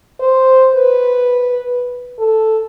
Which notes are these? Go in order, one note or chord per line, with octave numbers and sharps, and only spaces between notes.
C5
B4
A4